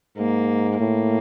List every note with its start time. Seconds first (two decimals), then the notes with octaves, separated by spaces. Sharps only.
0.17 G#2 A#3
0.79 A2 A#3